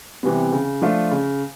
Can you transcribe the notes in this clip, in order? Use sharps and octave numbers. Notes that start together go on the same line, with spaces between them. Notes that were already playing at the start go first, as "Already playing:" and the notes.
C3 E3 G3 B3
C#3
F3 A3 D4 F4
C#3